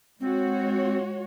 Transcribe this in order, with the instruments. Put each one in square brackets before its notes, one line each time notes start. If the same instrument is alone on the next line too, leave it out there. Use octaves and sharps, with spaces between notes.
[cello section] G#3 F#4 C#5 [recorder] C4